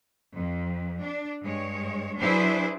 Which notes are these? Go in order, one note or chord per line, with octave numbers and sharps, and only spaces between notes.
F2
D4
G2 G#3 C#5
F#3 D4 E4 G#4 B4 C5